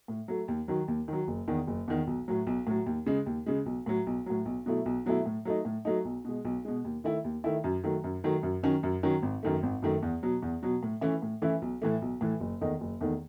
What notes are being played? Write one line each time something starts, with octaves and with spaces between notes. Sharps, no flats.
A2
F#3 A3
D#2
D#3 F#3
D#2
D#3 F#3
F#1
E2 D#3
F#1
E2 D#3
B1
A2 F#3
B1
A2 F#3
D#2
C#3 G#3
D#2
C#3 G#3
B1
A2 F#3
B1
A2 F#3
B1
B2 F#3 A3 E4
B1
B2 F#3 A3 E4
A2
F#3 A3 D#4
A2
F#3 A3 D#4
B1
B2 G#3
B1
B2 G#3
D#2
D#3 A3 E4
D#2
D#3 A3 E4
F#2
D#3 F#3 A3
F#2
D#3 F#3 A3
F#2
D#3 F#3 C#4
F#2
D#3 F#3 C#4
G#1
F#2 D#3 A3
G#1
F#2 D#3 A3
E2
B2 F#3
E2
B2 F#3
A2
E3 A3 C#4 E4
A2
E3 A3 C#4 E4
B1
A2 E3 A3
B1
A2 E3 A3
F#1
E2 D#3 A3 D#4
F#1
E2 D#3 A3 D#4